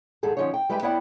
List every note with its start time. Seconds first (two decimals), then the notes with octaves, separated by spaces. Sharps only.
0.23 D#2 G#2 G3 G#4 A4
0.37 D3 F3 C#4 D#4 C#5
0.54 G5
0.69 G3 G#3 B4 E5 G5 G#5
0.83 B3 E4 C#5 D5 F#5 G5